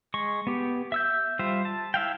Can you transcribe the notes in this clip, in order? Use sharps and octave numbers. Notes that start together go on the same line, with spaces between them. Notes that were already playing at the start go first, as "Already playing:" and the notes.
G#3 C#6
B3 G4
E5 E6 G6
G3 F4 C5 E5
A5
E4 E5 F5 G5